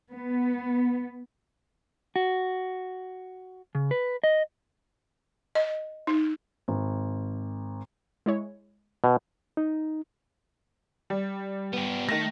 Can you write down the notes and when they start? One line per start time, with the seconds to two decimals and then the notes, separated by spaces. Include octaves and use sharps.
0.12 B3
2.16 F#4
3.75 C#3
3.91 B4
4.24 D#5
5.55 D#5
6.07 D#4
6.68 G#1
8.26 G#3 E4 C#5
9.04 B2
9.57 D#4
11.10 G3
11.73 B3 G4
12.09 D#3 A3 A#6